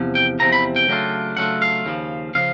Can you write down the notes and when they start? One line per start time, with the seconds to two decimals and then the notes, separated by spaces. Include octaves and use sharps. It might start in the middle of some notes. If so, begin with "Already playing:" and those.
Already playing: E2 C3 F3
0.15 G5
0.39 E2 C3 F3 A#5
0.52 B5
0.76 G5
0.88 C#3 F#3 A3 D4 F4
1.37 C#3 F#3 A3 D4 F4 F#5
1.62 F5
1.85 D#2 C#3 F3
2.35 C#3 F3 F5